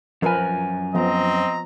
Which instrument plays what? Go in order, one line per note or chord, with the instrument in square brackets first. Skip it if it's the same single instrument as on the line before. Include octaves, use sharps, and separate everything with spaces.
[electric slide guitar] F#2 G#5 [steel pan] F3 A#4 B4
[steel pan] F3 B3 [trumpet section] C4 D#5 A#5